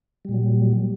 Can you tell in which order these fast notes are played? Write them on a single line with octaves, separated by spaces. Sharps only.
G3 A#2 F#3